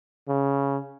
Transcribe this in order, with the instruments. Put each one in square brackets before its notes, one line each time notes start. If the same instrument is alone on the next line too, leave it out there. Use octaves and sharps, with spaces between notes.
[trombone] C#3